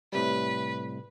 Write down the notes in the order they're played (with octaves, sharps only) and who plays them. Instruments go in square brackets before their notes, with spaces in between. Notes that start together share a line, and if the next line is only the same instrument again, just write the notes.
[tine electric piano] A2 C3 G3 [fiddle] B4